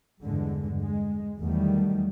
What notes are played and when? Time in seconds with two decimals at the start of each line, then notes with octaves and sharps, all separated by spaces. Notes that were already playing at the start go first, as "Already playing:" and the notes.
0.22 E2 G2 D3 G#3
0.81 G#3
1.39 E2 D#3 F#3 G3 A3